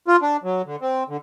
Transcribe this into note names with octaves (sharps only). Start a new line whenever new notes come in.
F4
D4
F#3
D3
C4
D3